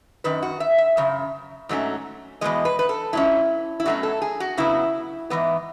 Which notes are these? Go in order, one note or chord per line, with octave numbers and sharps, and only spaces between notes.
F#2 D#3 B4
F#4
E5
E5
F#2 C#3
G#2 F#3 A3 C#4
E2 B2 G#3 D#5
B4
B4
A4
G#2 F#3 C#4 E4
E4
B2 F#3 A3 C#4 F#4
A4
G#4
F#4
C#3 F#3 B3 E4
G#2 E3 B3